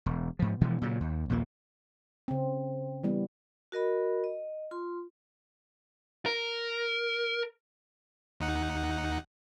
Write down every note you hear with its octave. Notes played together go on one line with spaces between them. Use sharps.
E1
G#2 F3
B2 E3 F3 G#3
A#2 C#3 F#3
D#2
A#1 D#2 A#2 A#3
C#3 C4
E3 G3 B3
F#4 A#4 D#5 B5
D#5
F4 C6
A#4
D#2 D#4 F#5